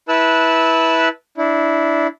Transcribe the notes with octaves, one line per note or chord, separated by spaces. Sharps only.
E4 B4 A5 E6 F#6
D4 E4